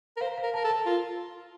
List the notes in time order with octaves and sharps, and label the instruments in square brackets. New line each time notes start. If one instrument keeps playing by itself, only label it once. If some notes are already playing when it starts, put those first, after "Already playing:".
[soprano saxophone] A#4
[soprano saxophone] C5 [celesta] F5
[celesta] F5
[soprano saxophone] A#4
[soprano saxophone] A#4 [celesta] A5
[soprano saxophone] A4
[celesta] A5
[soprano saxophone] F4 [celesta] A#4